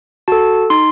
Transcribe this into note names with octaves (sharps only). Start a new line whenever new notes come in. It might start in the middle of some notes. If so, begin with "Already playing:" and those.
F#4 A4 A5
D#4 C6